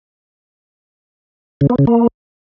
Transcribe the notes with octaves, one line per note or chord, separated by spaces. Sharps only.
C#3
B3
C#3
A#3